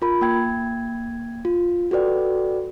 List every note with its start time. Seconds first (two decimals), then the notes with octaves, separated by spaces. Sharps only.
0.02 F4 A#4 B5
0.21 A#3 G5 G#6
1.45 F4
1.91 F#4 A4 B4 D5 G5